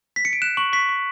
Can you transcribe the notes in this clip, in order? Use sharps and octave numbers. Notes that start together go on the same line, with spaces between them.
B6
C#7
D7
F#6 E7
C#6 F#7
C#6 B6
C#6